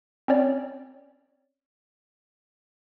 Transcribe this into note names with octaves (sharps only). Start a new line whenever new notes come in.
C4 C#4 C#5 D5